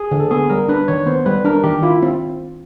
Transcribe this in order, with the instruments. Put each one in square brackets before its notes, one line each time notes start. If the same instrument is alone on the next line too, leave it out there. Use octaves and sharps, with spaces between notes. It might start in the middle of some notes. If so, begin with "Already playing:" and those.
Already playing: [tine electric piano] G#4
[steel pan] D3
[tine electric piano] A4
[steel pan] B3 [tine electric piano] G#4
[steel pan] G3 [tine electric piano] A#4
[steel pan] D4 [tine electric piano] B4
[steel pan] D#3 [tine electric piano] C#5
[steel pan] B3 [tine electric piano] C5
[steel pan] G3 [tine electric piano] B4
[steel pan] D4 [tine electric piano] A#4
[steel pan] D#3 [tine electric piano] G4
[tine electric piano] E4 [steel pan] F4
[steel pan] C4